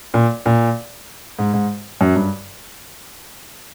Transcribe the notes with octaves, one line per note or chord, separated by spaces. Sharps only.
A#2
A#2
G#2
G#2
F#2
G2